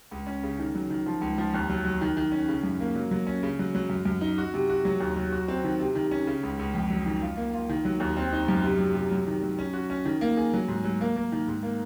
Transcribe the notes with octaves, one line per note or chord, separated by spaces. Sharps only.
C#2
C#4
C#3
D#3
F#3
D#3
F3
C#2
F3
D#2
F#3
F#3
D#3
D#3
C#4
C#3
F#2
A#3
F#3
F#3
C#4
C#3
F#3
F#3
F#2
F#2
D#4
F#4
C3
F#4
F#3
D#2
F#3
F#4
C4
D#3
C3
D#3
C#4
C#3
C#2
C#2
F2
F#3
D#3
F4
A#3
F4
D#3
F#3
D#2
C4
D#4
F#2
C3
F#3
C3
F#3
D#3
F#3
C#4
F#4
C#4
D#3
A#3
G#4
F#3
G#2
F#3
A#3
A#3
D#3
G#2
A#3